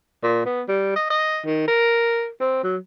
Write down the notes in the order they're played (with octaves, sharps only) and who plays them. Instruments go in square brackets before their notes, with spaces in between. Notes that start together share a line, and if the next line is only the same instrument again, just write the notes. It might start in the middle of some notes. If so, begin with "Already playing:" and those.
[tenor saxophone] A#2
B3
G3
D#5
D#5
D#3
A#4
C4
F#3